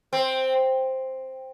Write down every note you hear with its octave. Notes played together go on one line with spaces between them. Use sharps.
C4